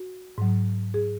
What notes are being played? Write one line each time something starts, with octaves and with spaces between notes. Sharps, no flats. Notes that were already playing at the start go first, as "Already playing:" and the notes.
Already playing: F#4
G#2 F#3
G#4